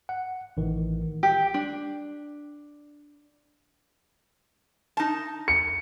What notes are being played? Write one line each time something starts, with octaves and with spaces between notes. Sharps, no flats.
F#5
A1 D#3 E3
G4
D4
D#4 A5
C#7